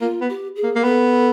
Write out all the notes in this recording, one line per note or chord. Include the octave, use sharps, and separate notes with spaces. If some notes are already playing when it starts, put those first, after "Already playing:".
A#3 F4
B3
G4
G#4
A#3
A#3
B3 A4